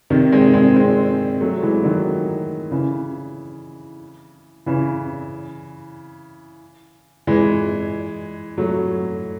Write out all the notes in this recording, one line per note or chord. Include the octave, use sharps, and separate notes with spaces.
C3 D#3
G#3 C4
G#3 C4
G#3 C4
F#3 A3
E3 G#3
D#3 F#3
C#3 E3
C#3 E3
E3 G#3
F#3 A3